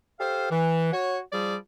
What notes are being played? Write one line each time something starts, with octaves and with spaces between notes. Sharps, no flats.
G4 A4 C5 F5
E3
F#4 C#5
F3 G3 G#4 D5